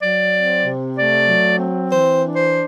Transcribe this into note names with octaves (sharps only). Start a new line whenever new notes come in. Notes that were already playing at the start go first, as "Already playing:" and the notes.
F#3 D5
C4
C3
A3 D5
F#3
C4
E3 C5
D4
C5